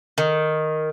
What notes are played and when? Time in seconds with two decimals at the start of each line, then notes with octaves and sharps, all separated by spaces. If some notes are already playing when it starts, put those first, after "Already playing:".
0.18 D#3